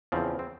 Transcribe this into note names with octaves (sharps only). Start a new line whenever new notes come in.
E2 C#3 F3 C4
C4